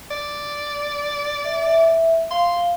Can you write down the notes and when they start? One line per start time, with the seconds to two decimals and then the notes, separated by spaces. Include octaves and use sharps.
0.11 D5
1.45 E5
1.62 E5
2.31 F5 C6